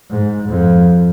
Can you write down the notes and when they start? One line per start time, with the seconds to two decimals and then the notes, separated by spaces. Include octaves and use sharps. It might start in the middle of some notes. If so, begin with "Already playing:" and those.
0.10 G#2
0.49 F2